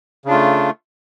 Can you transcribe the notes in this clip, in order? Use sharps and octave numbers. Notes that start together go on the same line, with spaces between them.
C#3 A3 D4 F4